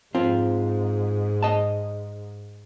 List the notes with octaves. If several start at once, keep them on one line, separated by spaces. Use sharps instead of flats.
G#2 C4 F4
D#5 A5